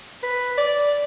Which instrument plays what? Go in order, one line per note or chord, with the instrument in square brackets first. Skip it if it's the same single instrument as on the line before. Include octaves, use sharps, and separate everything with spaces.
[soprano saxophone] B4
D5